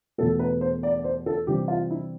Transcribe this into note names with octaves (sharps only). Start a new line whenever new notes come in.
E2 B2 A3 A4
B4
C5
D5
D5
C5
A4
C3 E3 G3 C4 G4
F4
E4